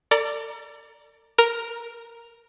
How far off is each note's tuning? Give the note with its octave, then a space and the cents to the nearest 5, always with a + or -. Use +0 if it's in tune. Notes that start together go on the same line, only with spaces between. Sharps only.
A4 +45 D5 +0 A#5 +15
A#4 +0 A#5 +0